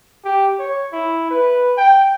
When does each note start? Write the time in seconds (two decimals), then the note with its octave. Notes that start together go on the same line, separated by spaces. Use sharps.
0.24 G4
0.59 C#5
0.92 E4
1.31 B4
1.77 G5